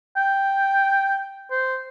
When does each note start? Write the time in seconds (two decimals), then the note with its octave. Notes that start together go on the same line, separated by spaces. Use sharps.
0.17 G5
1.51 C5